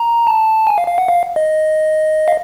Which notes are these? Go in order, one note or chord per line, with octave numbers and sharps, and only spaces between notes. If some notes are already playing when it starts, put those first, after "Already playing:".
Already playing: A#5
A5
G#5
F5
F5
F#5
F5
D#5
F5